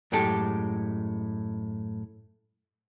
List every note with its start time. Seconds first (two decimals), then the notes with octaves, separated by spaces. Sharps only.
0.12 F#2 A2 G#3 G4 A4